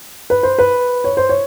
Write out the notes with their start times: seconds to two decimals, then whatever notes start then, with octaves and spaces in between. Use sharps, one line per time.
0.30 B4
0.43 C5
0.58 B4
1.04 C#5
1.17 C5
1.29 C#5